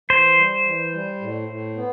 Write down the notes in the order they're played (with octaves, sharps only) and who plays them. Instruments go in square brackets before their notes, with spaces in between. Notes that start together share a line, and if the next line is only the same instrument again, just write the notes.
[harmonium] E3 [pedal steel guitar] C5
[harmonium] G3
E3
G3
A2
A2
B3